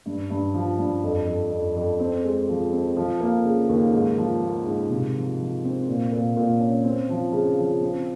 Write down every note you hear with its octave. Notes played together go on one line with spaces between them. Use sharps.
G2
G2
F3
G2
F2
F2
F2
F2
C4
G#3
F3
C4
F3
A#3
C#3
D#2
G#2
F3
A#3
G#2
C3
F3
F3
C4
A#2
A#2
A#2
C#4
C4
F3
C#3
F3
C4